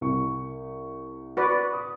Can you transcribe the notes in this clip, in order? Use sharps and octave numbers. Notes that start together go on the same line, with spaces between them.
C2 C#6
F#4 B4 D5
D#6